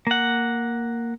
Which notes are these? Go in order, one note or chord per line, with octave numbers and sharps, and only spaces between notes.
A#3 F#5